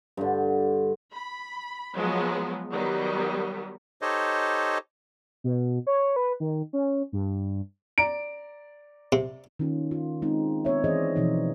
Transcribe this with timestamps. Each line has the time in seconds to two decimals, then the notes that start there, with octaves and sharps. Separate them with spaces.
0.17 G2 D3
1.13 B5
1.94 F3 F#3 G#3 B3
2.72 D#3 F#3 G3 B3
4.02 D#4 G4 A4 C5 C#5 D#5
5.44 B2
5.87 C#5
6.16 B4
6.40 D#3
6.73 C#4
7.13 G2
7.98 D5 A#5 D7
9.12 C3
9.59 D#3 A#3 C#4 F4
9.91 F4
10.22 G#3 C4 D#4
10.65 B3 C4 C#5 E5
10.84 E3 C4 G#4 C5 D5 D#5
11.16 B2 E3 F3 C4 D#4